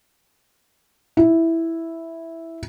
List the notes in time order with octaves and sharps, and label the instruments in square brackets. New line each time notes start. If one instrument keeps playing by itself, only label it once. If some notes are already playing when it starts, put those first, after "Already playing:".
[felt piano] E4